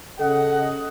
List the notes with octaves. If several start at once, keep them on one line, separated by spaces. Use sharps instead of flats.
C#3 A4 D#5 F#5